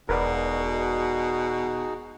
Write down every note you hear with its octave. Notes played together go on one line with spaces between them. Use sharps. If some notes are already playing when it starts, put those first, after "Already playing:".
E1 B2 D#4 F#4 G#4 A#4 B4 D5